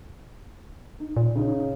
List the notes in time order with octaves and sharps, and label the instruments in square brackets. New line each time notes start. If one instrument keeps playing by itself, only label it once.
[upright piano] D#4
[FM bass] A#2
[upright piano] C#3 C#4 D#4